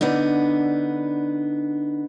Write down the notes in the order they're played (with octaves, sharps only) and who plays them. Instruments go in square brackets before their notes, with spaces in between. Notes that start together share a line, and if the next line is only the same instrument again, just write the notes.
[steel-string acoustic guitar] D3 B3 D4 D#4